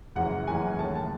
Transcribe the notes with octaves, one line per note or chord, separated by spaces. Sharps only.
F#1 F#2 E3 G#3 F#5
F#1 F#2 E3 G#3 G#5
D#2 C#3 F#3 A3 A5
A5